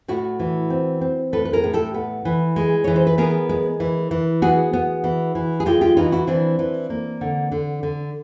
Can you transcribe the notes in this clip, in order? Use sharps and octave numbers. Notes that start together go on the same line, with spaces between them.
A2 E4 F#4
E3
C4
C4
A2 A4 B4
B4
G#4 A#4
A2
G4 A4
B3
E3
G#3
E3 C#5
C5
B4
B3 G#4 A#4
G#3
E3
E3
B3 F#4 G#4
B3
E3
E3
G#4
G#3 F4 G4
F4 G4
E3 D#4 F4
E4 F#4
E3 C4 D4
E3
A#3
D3
D3
D3